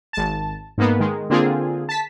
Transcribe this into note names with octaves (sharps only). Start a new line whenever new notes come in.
G#1 A5
G#2 A#3 B3
D#3 G#3
D3 A#3 C4 F4 G#4
A5 B6